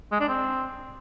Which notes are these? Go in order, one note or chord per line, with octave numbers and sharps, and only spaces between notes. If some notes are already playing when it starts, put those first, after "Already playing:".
G#3
D4
C4